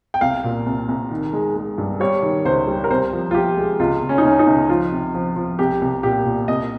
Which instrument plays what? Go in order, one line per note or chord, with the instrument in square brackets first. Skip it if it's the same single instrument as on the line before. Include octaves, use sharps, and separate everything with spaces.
[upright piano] G5
C2 F5
A#2
C2
C2
D#3
G#3
G#3
G2
G3 C#5
D#3
C#2 C5
G3
A#4
C2 C5
F3
F4
F3 G4
G#3
C#2 F4
C#2
C#4
D#4
C#2 C#4
D#4
C#2
F3 F4
C3
F3
F3
C2 G4
C2
A#2 G4
A#2
C2 D#5